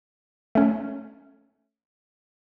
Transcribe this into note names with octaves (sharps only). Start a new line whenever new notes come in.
A3 C#4